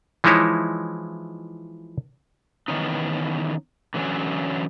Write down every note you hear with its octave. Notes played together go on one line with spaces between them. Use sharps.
E3 F3 G#3 D#4 E4 C#5
D#3 E3 B3 C#4 D#4
D3 E3 F#3 C4 C#4